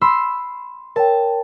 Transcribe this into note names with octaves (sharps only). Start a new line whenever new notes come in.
B5 C6 E6
A#4 C#5 G5 A5